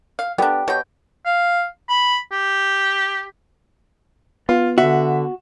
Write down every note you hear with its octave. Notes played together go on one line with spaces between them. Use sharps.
F5
B3 D4 G4 A4 D5
B2 G4 C#5 G5
F5
B5
G4
B3 F4
D3 F#4 E5